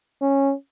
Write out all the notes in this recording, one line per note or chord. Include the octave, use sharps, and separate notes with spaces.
C#4